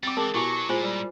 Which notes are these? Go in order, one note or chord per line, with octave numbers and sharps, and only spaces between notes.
G3 C4 D6 A6
E3 G#3 A#4 A5 D#6
B2 F#3 E4 G4 G#5 C#6
A#2 G#3 F4 C5 G#5
G3